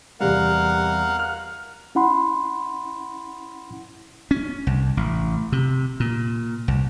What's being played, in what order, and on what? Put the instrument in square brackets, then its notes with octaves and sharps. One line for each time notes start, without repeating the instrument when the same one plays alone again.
[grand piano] E2 C3 G3 [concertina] A#4 F5 F#5
[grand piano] F6
[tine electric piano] C#4 E4 F#5 B5 C6
[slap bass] C#4
C2
A1
C3
A#2
C2